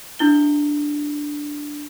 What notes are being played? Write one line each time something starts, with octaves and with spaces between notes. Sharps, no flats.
D4 E4 G7